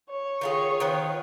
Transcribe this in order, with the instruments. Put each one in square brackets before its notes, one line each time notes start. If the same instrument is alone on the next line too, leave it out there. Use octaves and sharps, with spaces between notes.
[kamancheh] C#5
[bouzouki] D#3 F4 G#4
D#3 F3 B3